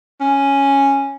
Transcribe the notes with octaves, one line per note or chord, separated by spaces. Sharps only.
C#4